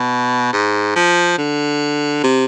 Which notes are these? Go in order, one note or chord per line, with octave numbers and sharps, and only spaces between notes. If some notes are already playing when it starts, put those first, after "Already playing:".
Already playing: B2
G#2
F3
D3
C3